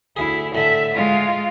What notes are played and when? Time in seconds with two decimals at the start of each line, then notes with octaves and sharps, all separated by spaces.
0.16 D2 E4 G#4
0.55 A2 D3 E5
0.94 G#3 F4